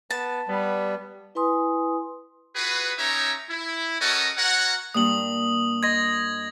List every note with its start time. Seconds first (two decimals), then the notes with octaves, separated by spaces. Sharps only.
0.10 B3 A5
0.49 G3 B3
1.35 E4 B4 G#5 C6 D#6
2.56 F4 F#4 G#4 B4
2.99 C#4 D#4 G4 C#5 E5 A#5
3.50 E4
4.01 C#4 F#4 A4 A#4 C#5 D#5
4.38 F#4 A#4 C#5 F#5
4.94 G2 A#3 D#6 F#7
5.83 D#5 C6 G#6 A#6